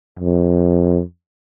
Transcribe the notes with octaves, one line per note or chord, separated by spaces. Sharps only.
F2